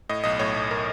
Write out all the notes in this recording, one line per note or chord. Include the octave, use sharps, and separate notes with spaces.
A2 D#5
B1 D#5
A2 C#5
B1
A#4